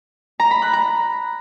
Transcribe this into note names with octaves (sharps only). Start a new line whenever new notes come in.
A#5
B5
F#6
A#5